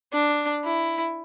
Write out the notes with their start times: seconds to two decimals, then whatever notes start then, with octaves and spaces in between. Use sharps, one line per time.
0.13 D4
0.65 E4